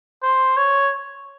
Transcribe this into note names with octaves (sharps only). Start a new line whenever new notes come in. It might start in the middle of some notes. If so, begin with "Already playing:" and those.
C5
C#5